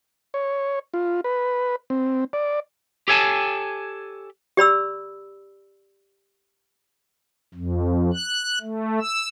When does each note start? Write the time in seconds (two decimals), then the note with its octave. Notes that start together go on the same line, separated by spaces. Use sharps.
0.34 C#5
0.94 F4
1.24 B4
1.90 C4
2.33 D5
3.08 G4 A4 C#5 G#5 A5
4.57 G4 D5 B5 E6
7.54 F2
8.14 F#6
8.61 A3
9.00 E6